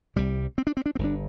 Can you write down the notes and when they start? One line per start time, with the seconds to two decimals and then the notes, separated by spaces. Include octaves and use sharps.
0.16 C2 C3 G3
0.58 C4
0.67 D4
0.77 C4
0.86 D4
0.95 C4
0.99 G1 G2 D3
1.04 D4